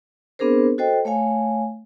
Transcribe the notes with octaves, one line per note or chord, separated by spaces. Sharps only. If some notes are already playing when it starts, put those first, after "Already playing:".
B3 C4 D4 G#4 A#4 C5
F#4 A4 C5 D#5 G5
A3 C#5 F5 G#5